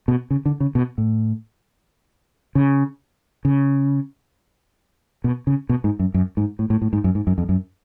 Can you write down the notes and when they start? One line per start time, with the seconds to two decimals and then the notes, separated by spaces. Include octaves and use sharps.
0.08 B2
0.31 C#3
0.46 D3
0.60 C#3
0.75 B2
0.98 A2
2.55 C#3
3.45 C#3
5.24 B2
5.47 C#3
5.69 B2
5.84 G#2
5.99 F#2
6.14 F#2
6.37 G#2
6.59 A2
6.70 A2
6.82 A2
6.93 G#2
7.04 F#2
7.15 G#2
7.27 F#2
7.38 F2
7.49 F#2